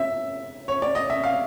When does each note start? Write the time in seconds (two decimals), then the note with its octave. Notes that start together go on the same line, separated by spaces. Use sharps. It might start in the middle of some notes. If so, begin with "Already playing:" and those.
Already playing: E5
0.68 C#5
0.82 D5
0.95 D#5
1.10 E5
1.24 F5